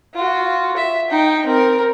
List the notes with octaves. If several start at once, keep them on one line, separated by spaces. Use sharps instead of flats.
F4 F#4
E5
D#4 G5
C4 A#4